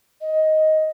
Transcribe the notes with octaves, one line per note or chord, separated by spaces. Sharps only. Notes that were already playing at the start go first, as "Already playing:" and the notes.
D#5